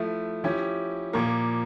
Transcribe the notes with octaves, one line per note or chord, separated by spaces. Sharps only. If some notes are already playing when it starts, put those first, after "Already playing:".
Already playing: F3 A3 E4
F3 C#4 E4 G4
A#2 F3 A#3